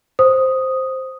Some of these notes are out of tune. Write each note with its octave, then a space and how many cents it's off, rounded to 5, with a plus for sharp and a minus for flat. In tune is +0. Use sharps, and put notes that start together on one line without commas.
C5 +0 D#6 +0